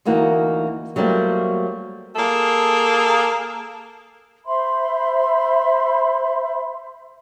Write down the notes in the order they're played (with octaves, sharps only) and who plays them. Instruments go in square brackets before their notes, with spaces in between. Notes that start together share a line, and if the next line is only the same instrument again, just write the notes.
[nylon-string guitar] D2 E3 A#3 D#4 F#4
F#3 G3 A3 A#3 C4 F#4
[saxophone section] A#3 G#4 A4
[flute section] C5 E5 B5 C6